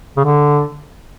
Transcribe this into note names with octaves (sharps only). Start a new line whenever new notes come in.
C#3
D3